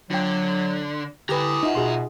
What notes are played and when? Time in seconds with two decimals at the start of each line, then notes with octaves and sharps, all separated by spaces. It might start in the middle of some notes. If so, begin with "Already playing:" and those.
0.11 D3 F#3 F4 G5
1.29 D3 E4 G4 B4 G#5 A#5 D6 D#6
1.63 D#4 F4 E5 F#5
1.75 B2 F#4 G#4 C6